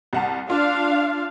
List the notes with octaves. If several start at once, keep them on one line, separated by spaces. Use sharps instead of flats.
C2 F#5 A5
D4 F4 F5